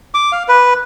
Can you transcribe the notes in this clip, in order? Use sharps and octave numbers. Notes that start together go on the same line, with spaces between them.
D6
F5
B4